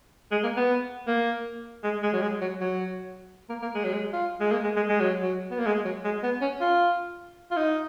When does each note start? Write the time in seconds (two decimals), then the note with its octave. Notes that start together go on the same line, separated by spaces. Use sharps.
0.32 G#3
0.43 A#3
0.57 B3
1.07 A#3
1.84 G#3
2.03 G#3
2.13 F#3
2.22 G#3
2.41 F#3
2.61 F#3
3.49 A#3
3.62 A#3
3.75 G#3
3.84 F#3
3.93 G#3
4.13 F4
4.40 G#3
4.52 A#3
4.64 G#3
4.76 G#3
4.89 G#3
5.00 F#3
5.22 F#3
5.51 B3
5.59 A#3
5.66 G#3
5.85 F#3
6.04 G#3
6.23 B3
6.41 C#4
6.61 F4
7.51 F4
7.57 D#4